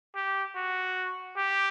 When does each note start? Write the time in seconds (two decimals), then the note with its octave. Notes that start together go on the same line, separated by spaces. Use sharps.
0.15 G4
0.55 F#4
1.37 G4